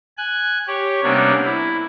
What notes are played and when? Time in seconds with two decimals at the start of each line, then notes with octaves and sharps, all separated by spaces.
0.17 G#5 F#6
0.67 G4 C#5
1.03 C3 G3 A#3 B3 C#4 D4
1.44 E4